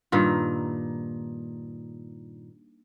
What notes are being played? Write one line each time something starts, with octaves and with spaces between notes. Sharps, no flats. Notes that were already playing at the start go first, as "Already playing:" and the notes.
G2 A#2 D#3